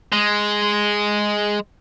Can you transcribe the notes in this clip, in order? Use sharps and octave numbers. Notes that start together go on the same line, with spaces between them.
G#3